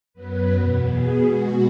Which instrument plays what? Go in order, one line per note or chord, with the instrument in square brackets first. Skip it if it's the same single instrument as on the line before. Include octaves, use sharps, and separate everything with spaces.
[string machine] F#2 F#3 B3 B4
E2 B2 B3
B2 B3 G#4
B2 G#3 B3 F#4